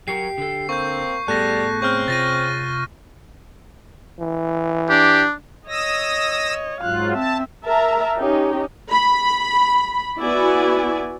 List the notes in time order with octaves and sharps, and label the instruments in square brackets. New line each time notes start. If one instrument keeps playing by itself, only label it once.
[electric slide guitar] F#3 F#4 A#4 [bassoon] G4 [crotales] C7
[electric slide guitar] D3 A4
[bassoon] A#3 [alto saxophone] C4 [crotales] C#6 G6
[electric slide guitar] A2 B3 G#4 [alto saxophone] G3 [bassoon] A4 [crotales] F#6 A#6
[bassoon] C#3 [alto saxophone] C4 [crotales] C#6 F6
[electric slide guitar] C3 F4 [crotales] A6 A#6 D#7
[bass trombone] E3
[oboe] D4 [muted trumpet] G4
[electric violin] C#5 D#5 [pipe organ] D#6 E6 A#6
[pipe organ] G#2 F#3 F4 [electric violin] F5 F#6
[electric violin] C4 E5 [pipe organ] A5
[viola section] A#4 E5 A5 A#5
C#4 D#4 G4
B5
B3 E4 F#4 D5 G#5